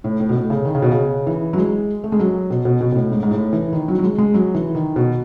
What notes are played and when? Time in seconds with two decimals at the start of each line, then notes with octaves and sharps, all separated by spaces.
0.04 A2
0.20 A2
0.29 B2
0.35 A2
0.50 C#3
0.65 D#3
0.75 C#3
0.82 B2
0.92 C#3
1.27 E3
1.53 F#3
1.58 G#3
2.04 A3
2.12 G#3
2.19 F#3
2.50 B2
2.65 B2
2.81 B2
2.92 B2
2.96 A2
3.12 G#2
3.23 G#2
3.31 A2
3.53 E3
3.73 D#3
3.88 F#3
3.99 F#3
4.03 G#3
4.18 G#3
4.34 F#3
4.55 E3
4.75 D#3
4.96 B2